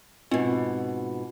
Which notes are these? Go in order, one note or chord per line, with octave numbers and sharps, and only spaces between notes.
G#2 B2 C4 F4